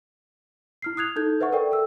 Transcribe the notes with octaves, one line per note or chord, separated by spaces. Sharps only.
E4 F6 C7
D#6 F#6 G#6 F7
D#4 E4 A4 G6 G#6
B4 C5 E5 F#5 C#6
A4 A#4 D5 E5 G5
A4 A#4 E6